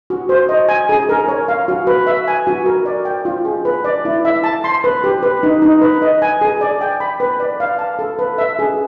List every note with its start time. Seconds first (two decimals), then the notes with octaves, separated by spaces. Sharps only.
0.10 F#4
0.29 C5
0.49 D#5
0.69 G#5
0.89 G#4
1.09 A#4
1.28 C#5
1.48 F5
1.68 F#4
1.87 B4
2.07 E5
2.28 G#5
2.47 F#4
2.66 A#4
2.86 D5
3.05 G5
3.25 F4
3.45 G#4
3.65 B4
3.84 D5
4.05 E4
4.25 E5
4.44 A5
4.64 C6
4.84 B4
5.04 G4
5.23 B4
5.43 D#4
5.62 D#4
5.81 B4
6.02 D#5
6.22 G#5
6.41 G#4
6.61 D5
6.81 G5
7.00 B5
7.20 B4
7.40 D5
7.60 F5
7.79 A5
7.99 A4
8.19 B4
8.38 E5
8.59 G#4